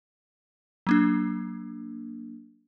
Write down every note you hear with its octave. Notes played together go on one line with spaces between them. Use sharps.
F#3 A#3 D4